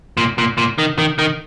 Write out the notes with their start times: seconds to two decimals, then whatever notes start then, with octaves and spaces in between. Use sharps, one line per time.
0.17 A#2
0.38 A#2
0.58 A#2
0.78 D#3
0.99 D#3
1.19 D#3